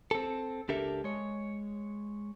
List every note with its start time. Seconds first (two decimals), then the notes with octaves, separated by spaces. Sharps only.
0.11 C4 A4
0.69 C#2 D4 G4 A4 A#4 E5
1.04 G#3 C#5